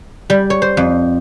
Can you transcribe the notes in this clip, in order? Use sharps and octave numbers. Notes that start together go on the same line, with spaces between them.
G3
C#5
C5
F2